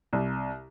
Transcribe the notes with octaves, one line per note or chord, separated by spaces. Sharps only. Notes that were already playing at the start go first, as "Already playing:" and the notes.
C2